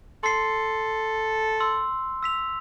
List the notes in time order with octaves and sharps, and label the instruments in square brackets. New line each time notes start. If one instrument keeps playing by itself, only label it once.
[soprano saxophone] A4 [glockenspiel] C6 C7
[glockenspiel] C6 E6
E6 B6 F7